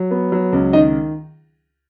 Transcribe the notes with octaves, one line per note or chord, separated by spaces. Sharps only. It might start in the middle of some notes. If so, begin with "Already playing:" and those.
Already playing: F#3
B3
F#3
C#2
D#3 D#4 D#5